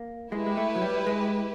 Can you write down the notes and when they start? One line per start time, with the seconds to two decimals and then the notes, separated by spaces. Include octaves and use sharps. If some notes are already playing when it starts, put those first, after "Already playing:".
Already playing: A#3
0.32 G#3 E4 G4 B4
0.47 G#3
0.57 A3
0.76 F#3
0.82 G3
1.07 G#3